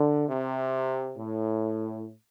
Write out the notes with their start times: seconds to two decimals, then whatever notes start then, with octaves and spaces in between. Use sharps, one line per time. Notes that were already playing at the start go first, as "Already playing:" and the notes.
Already playing: D3
0.28 C3
1.17 A2